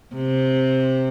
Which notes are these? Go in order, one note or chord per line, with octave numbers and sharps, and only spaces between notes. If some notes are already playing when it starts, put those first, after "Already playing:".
C3